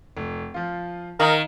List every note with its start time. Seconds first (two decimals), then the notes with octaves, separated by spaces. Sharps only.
0.17 F1
0.54 F3 F4
1.20 D#3 A#4 F5 D#6 F#7